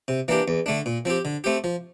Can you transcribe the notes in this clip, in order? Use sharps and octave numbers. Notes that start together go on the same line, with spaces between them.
C3
E3 A#3 D4 G4
E2
D3 A3 D4
A#2
F3 C4 G4
D3
A3 C4 G4
F3